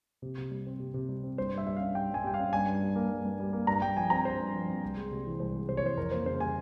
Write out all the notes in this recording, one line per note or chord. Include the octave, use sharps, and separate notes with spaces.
C3
C3
G3
C4
C3
C3
G3
C4
G2 C5
G2 E5
G3 E5
C#4 F5
G2 G5
G2 G#5
G3 G5
F5
C#4
G2 G#5
G2
G3
A#3
G2
G2
G3
A#3
G2 A#5
G2 G5
F3 G#5
C4 A#5
G2 C5
G2
F3
C4
C2
G#3
C3
E3
C2 C5
G#3
C3 C5
C#5
E3 C5
F2 A#4
A#3 C5
C#3 C5
G3 G#5